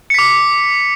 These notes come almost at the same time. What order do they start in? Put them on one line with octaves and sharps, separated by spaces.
C#7 B6 D6